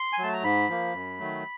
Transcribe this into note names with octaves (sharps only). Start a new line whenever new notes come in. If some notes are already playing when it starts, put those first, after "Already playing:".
Already playing: C6
G#5
F#3 A3 A5
A#5
G#2 B5
F3 A#3
F#2
D#3 F#3 A3